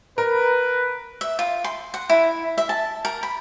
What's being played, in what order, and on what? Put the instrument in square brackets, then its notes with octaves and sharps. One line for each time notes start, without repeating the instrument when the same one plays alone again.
[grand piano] A#4 [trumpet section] B4
[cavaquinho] E5
F4
C6
F#5
E4
E5
A5
A#4
B5